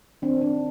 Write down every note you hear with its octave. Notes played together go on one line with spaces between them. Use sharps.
D#3 C4 D4
D#3 C4 D4